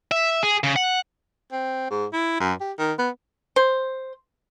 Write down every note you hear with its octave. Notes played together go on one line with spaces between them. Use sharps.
E5
G#4
C#3
F#5
C4
G#2
E4
F#2
G4
D#3
B3
C5